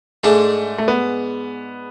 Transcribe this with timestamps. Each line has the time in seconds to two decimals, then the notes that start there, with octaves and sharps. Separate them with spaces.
0.24 G#2 G#3 A3 D4
0.78 A3
0.88 B3